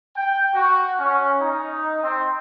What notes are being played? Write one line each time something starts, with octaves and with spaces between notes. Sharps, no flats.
G5
F#4
C#4
D#4
C4